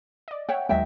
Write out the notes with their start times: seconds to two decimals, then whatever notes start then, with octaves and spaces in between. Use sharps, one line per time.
0.28 D5 D#5
0.49 C#5 E5 F#5 G5
0.69 D#2 F#3 G#3 D#5 E5 G5